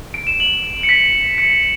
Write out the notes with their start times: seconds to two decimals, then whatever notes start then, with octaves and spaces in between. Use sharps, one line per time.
0.14 D7
0.27 E7
0.40 F#7
0.83 C#7
0.89 B6
1.38 C#7